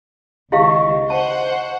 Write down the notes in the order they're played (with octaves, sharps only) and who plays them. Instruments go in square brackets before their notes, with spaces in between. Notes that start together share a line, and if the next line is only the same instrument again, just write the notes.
[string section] C#2 D#3 [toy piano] E4 G4 F5 [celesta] D#5 C#6
[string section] C5 F#5 [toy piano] A5